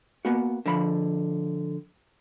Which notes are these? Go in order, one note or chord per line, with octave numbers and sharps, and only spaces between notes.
A#3 B3 F#4
D3 F3 B5